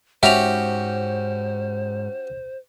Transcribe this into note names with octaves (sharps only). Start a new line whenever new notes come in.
G#2 G#3 C#4 F#4 G4 C5 E5 F7